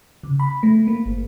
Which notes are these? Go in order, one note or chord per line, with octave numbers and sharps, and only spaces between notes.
C#3
B5
A3
A#3
G1